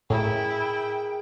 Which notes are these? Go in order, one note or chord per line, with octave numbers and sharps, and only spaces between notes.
A2 E4 G#4 A#4 E5 G5